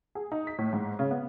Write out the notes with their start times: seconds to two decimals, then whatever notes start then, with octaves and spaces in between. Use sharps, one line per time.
0.15 G#4
0.32 D#4
0.47 B6
0.58 A2
0.73 G#2
0.99 C#3
1.11 B3